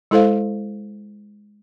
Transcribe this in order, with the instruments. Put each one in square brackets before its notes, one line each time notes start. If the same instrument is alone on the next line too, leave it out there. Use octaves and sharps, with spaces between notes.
[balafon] G#3 E4 A4 C5 F5